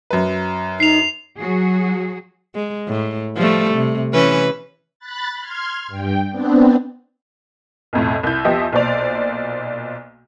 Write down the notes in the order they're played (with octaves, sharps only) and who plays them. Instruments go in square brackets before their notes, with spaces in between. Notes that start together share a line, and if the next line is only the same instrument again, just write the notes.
[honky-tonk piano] F#2 B4
[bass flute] D#4 [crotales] C7 F7
[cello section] F#3 F#4 G#4
[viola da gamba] G#3
A2
F3 G3 A3
C3
E3 C#4 B4
[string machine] B5 F#6 A6
C6 F6 G#6
G2 G5
B3 C4 D4
[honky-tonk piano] B1 F2 A2
C2 E4 G6
E2 F3 G4 D#5 E5
B1 A#2 C5 D5 F7